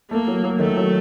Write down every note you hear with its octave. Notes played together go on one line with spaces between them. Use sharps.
A3 A#3
F#3
F#3
D#3 A3
F#3